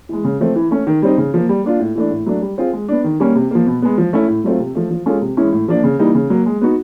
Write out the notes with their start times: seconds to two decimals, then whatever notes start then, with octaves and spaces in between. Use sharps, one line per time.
0.09 E3 G#3
0.24 C#3
0.40 F3 A3 C4
0.56 E3
0.71 A3 C#4
0.87 D#3
1.02 G3 C4 D#4
1.18 C#3
1.34 F3 A#3
1.49 G3
1.64 A#3 D4 F4
1.80 A2
1.95 E3 A3 D4
2.11 A2
2.26 F#3 A3 D4
2.42 G3
2.58 C4 F4 G#4
2.73 G#3
2.88 B3 D4
3.04 D#3
3.20 G3 A#3 C#4
3.35 C3
3.51 F3 A#3
3.67 B2
3.82 G#3 B3
3.98 F3
4.13 A3 C#4 E4
4.28 A2
4.44 F#3 A3 C4 F4
4.60 C3
4.75 F3 A3
4.91 F3
5.06 G#3 C#4 F4 A4
5.22 C3
5.37 E3 G#3 C#4 E4
5.53 A2
5.68 F3 A#3 D4
5.84 C#3
5.99 E3 G3 A#3 D#4
6.15 C#3
6.30 F#3 A#3
6.46 G#3
6.61 B3 D#4 F#4